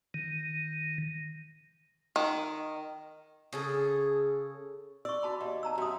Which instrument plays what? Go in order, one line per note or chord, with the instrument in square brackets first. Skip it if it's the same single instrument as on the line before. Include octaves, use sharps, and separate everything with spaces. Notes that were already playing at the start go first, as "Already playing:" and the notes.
[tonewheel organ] D#3
[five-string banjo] D#3
[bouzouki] C#3 G#4 A4
[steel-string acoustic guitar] D5 [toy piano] C#6 E6
[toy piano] F#4 A5 B5
[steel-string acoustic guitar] D#2
[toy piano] A5 A#5 E6
[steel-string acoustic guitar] F#2 [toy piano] F#4 D#6